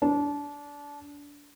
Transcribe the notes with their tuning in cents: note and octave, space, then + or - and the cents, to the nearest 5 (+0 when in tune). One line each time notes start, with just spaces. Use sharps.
D4 -25